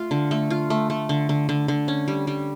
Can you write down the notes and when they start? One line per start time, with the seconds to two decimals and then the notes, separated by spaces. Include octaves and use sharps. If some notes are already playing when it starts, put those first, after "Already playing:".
Already playing: A3 F4
0.11 D3
0.31 A3
0.50 F4
0.70 A3
0.90 A3
1.09 D3
1.29 D3
1.49 D3
1.68 D3
1.88 C#4
2.08 G3
2.27 G3